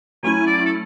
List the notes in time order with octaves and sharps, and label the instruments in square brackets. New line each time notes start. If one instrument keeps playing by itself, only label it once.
[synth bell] F#3 A3 C#4 E4 [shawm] G#5
[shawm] D5
A4